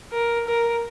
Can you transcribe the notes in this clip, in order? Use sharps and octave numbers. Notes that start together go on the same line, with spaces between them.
A#4
A#4